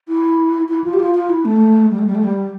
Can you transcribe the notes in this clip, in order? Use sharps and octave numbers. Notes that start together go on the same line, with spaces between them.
E4
E4
F4
G4
F4
F4
E4
A3
G3
A3
G3
A3
G3